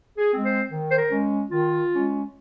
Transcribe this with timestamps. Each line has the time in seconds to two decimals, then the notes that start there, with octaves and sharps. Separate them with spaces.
0.18 G#4
0.32 G#3 C4
0.45 C5
0.72 D#3
0.90 C5
0.98 A#4
1.11 G#3 C#4
1.51 D#3 F4
1.91 G#3 C#4